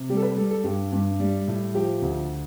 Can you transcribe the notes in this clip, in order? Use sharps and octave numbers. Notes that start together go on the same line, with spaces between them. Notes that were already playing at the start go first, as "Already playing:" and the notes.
Already playing: C3
G3 G4
A4
B4
G3 A4
A4
G2 G4
G2
G3
A2
F3 G4
D2